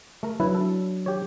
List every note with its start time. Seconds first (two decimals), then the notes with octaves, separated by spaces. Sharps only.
0.23 A3 A#4
0.40 F#3 D4 E4 B4
0.55 A4
1.06 G4 C#5